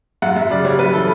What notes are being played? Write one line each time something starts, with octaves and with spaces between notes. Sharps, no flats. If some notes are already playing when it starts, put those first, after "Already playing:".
F#2 F#5
F#2 E5
C#3 D5
G3 C#5
F#2 B4
E3 A4